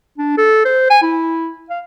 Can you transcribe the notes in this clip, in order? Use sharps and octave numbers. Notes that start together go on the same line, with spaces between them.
D4
A4
C5
G#5
E4
F5